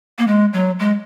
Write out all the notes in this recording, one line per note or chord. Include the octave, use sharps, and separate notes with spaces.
A#3
G#3
F#3
G#3